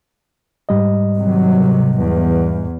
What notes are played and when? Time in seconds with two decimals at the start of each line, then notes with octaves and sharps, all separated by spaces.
0.69 G#2 G3 D#5
1.18 C3 D#3 F#3
1.99 E2